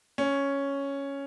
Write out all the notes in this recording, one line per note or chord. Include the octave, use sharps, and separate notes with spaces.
C#4